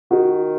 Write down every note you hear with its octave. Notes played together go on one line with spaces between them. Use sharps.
D#3 F#4